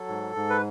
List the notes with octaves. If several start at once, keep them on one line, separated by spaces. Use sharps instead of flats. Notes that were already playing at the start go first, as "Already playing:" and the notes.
Already playing: F#3 A4
G#2
G#2
B4